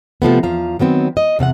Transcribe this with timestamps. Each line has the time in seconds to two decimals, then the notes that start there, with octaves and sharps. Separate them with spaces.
0.22 C3 F3 A3 B3
0.43 E2 F3 F5 A#5
0.79 D#3 F#3 B3 C4
1.17 D#5
1.39 E2 C3 F5 F#5